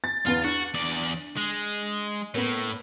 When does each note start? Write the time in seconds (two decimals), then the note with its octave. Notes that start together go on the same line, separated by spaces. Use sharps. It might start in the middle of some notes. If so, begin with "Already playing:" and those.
0.04 A6
0.26 E2 B3 F4
0.44 D4 F#4
0.74 E2 D5
1.37 G#3
2.35 A2 A#3 B3